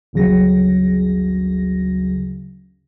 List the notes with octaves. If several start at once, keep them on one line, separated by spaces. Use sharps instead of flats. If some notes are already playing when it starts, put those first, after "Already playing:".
G1 D2 C#3 F#3 A#6